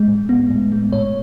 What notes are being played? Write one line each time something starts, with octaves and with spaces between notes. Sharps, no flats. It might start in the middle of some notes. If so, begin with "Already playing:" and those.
Already playing: G#3
A2
B3
A2
G#3
A2 C#5